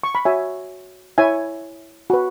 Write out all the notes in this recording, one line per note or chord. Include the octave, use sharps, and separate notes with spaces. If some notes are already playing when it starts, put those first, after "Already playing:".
C#6
B5
F#4 C#5 E5 G#5
E4 C#5 E5 G#5
F#4 B4